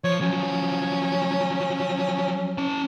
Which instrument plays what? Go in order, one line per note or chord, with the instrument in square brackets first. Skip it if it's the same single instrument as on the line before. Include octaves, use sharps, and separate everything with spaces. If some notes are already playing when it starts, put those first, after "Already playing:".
[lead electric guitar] F3 [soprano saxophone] C#5
[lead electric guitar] F3 F#3 [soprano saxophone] C#4
[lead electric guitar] C#4 A5